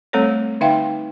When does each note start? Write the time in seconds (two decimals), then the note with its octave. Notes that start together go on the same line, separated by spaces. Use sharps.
0.13 G3 A3 C4 A4 C5 C#5
0.61 D3 D#4 E5 F5 G5 C6